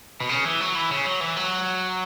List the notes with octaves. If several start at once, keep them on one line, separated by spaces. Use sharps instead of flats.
B2
C#3
E3
F#3
E3
C#3
F#3
E3
F#3